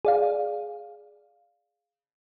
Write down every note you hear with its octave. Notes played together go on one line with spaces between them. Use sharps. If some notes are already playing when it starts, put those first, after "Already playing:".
G#4 D5 F5